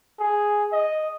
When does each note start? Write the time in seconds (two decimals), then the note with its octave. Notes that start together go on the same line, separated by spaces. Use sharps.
0.20 G#4
0.73 D#5